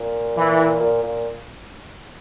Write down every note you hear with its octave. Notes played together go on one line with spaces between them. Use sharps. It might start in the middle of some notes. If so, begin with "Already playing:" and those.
Already playing: A#2
E3
A#2
A#2